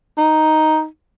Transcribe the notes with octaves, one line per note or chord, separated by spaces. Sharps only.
D#4